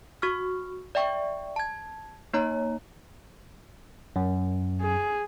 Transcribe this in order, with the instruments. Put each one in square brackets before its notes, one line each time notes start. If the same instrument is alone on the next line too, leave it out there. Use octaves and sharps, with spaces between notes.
[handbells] F#4 C#6 F6
D5 E5 G5 C#6
A5 G#6
A#3 D#4 C#5 A#5
[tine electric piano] F#2
[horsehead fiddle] G#4